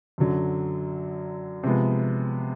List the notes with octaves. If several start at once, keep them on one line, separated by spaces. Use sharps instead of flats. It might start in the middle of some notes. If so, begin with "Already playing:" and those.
F#2 D3 F#3
C3 F3 G#3 B3